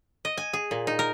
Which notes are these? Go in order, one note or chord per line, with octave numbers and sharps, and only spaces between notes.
D#5
G#5
G#4
A#2
D#4
A#4